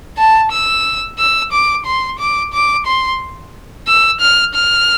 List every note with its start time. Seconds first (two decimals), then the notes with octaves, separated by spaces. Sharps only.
0.18 A5
0.52 E6
1.19 E6
1.52 D6
1.86 C6
2.19 D6
2.53 D6
2.86 C6
3.87 E6
4.21 F6
4.54 F6